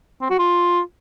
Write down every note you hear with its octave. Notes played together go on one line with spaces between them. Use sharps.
C4
F#4
F4